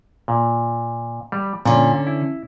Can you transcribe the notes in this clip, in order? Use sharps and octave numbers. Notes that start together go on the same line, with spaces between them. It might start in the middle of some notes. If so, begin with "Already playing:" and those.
A#2
G3
A#2 D3 C#4
E4